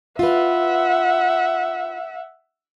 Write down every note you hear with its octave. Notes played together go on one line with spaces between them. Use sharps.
F4 B4 E5 F#5